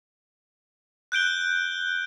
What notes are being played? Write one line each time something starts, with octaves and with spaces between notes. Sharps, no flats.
F#6 G6 D7 G7